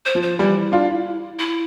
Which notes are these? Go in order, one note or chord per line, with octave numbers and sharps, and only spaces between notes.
C5
F3
C5
E3 G3 E4
D4 F4
E4